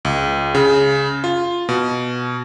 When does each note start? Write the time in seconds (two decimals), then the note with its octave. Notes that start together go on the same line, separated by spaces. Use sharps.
0.05 C#2
0.55 C#3
1.24 F4
1.69 B2